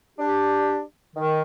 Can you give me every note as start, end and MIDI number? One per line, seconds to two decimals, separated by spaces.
0.19 0.80 62
0.19 0.80 67
1.16 1.42 51